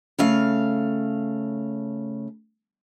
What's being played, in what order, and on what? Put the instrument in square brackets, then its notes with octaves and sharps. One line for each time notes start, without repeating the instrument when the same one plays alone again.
[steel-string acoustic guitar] C#3 A3 F5